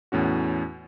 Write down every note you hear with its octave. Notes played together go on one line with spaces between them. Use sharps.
E2 A2 C#4 F#4